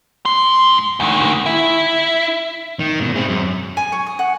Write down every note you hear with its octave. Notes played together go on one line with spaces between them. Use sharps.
G#2 C6
D2 D#3
E4
D#3
G#2 B2
C4 G#4
F#2
G#5
C#5
D#6
F#5